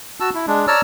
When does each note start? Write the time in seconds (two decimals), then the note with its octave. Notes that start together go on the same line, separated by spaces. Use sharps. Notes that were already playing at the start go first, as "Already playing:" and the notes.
0.20 F#4 A5 E6
0.35 E4
0.47 G#3 D4
0.68 C#5 D5 A5 A#5 E6 F6